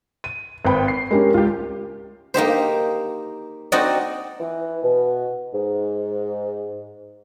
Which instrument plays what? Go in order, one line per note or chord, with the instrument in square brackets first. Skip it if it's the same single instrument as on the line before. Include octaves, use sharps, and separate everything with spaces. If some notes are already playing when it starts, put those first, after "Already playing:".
[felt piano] D#7
[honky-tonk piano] G#1 B4 G5 [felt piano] C5 B5
[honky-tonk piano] C7
[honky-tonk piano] G#3 [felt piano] C#4 G4 A#4
[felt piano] C#2 [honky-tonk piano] F4 G4
[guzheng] A#3 D#4 G4 C5
C4 D#4 F#4 D5 D#5 F#5
[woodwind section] E3
B2
G#2